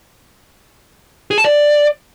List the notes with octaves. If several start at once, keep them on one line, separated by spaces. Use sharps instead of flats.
G#4
A5
D5